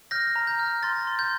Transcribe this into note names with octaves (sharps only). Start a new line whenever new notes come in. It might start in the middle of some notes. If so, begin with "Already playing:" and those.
F6 G6 A#6
A#5
G6
F6
C6 A6
C6
G6